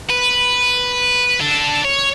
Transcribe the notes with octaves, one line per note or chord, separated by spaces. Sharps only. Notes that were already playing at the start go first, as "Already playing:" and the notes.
B4
D4 A4
C#5